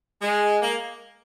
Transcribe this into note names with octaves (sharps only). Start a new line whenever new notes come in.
G#3
A#3